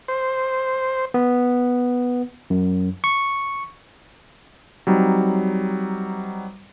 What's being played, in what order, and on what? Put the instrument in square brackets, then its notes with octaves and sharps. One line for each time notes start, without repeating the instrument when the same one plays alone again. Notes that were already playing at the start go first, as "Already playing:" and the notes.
[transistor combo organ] C5
[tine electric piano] B3
F#2
C#6
[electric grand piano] F#3 G3 C4 D#4